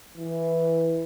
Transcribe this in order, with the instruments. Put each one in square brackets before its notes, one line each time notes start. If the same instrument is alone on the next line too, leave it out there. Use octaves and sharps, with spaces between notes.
[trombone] E3